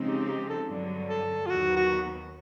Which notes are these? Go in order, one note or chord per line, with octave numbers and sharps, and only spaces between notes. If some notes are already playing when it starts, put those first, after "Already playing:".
Already playing: C#3 F3 G#3 C4 D#4
G4
G4
A4
G2 D3 F#3
A4
F4
D#2 D#3 F#3 B3 F#4
F#4